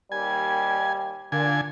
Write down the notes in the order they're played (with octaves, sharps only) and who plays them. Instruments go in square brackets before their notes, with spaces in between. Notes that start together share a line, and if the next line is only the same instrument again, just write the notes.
[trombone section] D#2 G3 [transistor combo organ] G#5
[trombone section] A#2 [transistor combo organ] D3 G#5